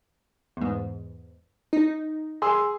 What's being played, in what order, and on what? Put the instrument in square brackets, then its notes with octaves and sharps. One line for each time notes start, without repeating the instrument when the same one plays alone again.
[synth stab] E2 G#2
D#4
[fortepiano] G#4 C6 E6